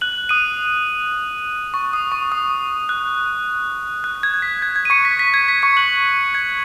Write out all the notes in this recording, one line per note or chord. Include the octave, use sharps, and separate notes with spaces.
F#6 F#7
D#6 D#7
C#6
D#6
C#6
D#6
F#6
F#6
G#6
G#6
B6
G#6
G#6
D#7
C#6 C#7
B6
B6
G#6
B6
C#6 C#7
F#6 F#7
G#6